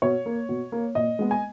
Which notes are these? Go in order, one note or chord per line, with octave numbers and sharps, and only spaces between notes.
B2 C#5
A#3
B2
A#3
A#2 D#5
G#3 B3
G#5